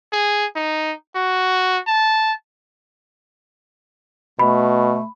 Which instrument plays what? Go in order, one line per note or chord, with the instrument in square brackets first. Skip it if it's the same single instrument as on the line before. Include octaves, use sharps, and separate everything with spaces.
[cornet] G#4
D#4
F#4
A5
[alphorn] B2 [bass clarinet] A3 [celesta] B5